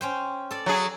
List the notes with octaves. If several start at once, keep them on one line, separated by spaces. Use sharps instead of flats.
C#4 C5 G5
A4 D5
F#3 G#4